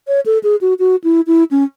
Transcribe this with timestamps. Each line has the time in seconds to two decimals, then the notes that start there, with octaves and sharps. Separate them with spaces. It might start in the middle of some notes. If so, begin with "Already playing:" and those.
0.08 C#5
0.26 A4
0.43 G#4
0.61 F#4
0.79 F#4
1.04 E4
1.27 E4
1.51 C#4